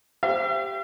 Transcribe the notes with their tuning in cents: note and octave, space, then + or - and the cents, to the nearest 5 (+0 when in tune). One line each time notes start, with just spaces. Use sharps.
G4 +0 C5 +0 E5 +45